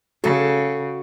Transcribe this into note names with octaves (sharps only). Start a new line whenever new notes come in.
C#3 F#4 A4